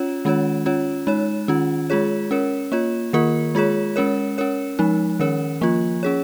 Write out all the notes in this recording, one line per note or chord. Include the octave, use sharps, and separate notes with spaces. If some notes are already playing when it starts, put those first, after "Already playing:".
Already playing: C#4 F4 C#5
D#3 G#3 C#4 F4 C#5
C#4 F4 C#5
G#3 D#4 C#5
D#3 C#4 F4
G#3 F4 G#4 C#5
C#4 A#4 C#5
A#3 F4 C#5
D#3 A#3 F4 A#4
G#3 F4 G#4 C#5
G#3 C#4 A#4 C#5
C#4 A#4 C#5
F3 G#3 D#4
D#3 C#4 A#4 C#5
F3 A#3 F4
C#4 G#4 C#5